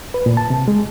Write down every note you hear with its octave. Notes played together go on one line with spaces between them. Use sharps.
B4
A#2
A5
C3
G#3